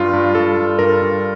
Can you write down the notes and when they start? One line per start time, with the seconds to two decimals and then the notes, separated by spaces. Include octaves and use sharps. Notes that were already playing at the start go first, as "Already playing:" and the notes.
Already playing: G2 F4
0.13 G2
0.35 G2 A4
0.57 G2
0.79 G2 A#4
1.02 G2